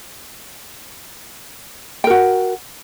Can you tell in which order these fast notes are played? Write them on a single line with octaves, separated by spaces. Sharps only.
G5 A#4 F#4